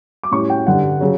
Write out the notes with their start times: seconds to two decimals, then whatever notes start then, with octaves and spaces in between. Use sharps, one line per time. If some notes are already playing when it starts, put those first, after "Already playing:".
0.23 D6
0.31 A2 G3 C#4 E4 C#6
0.50 G5
0.67 G2 D3 G3 D4 F#5
1.00 C#3 F#3